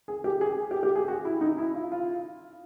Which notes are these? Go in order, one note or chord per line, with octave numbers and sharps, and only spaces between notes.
G#4
G4
G#4
G4
G4
G#4
F#4
E4
D#4
E4
F4
F4